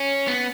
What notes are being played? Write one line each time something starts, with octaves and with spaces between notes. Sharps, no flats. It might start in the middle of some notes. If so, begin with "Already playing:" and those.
Already playing: C#4
B3